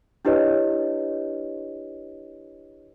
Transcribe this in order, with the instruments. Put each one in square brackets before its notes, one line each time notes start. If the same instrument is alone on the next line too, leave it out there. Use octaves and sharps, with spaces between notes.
[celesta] D4 E4 G4 B4 C#5 D#5